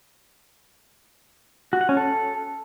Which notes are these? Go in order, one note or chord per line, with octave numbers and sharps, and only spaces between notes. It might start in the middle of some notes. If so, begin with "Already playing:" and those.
F#4
F#5
C#4
A4